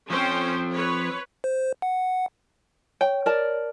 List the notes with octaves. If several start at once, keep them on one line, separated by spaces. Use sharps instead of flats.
F3 C4 C#4 C5 G5
B4 C#5
C5
F#5
C#5 G5
A#4 D5 A5